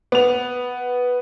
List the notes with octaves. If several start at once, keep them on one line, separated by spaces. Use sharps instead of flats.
B3 F7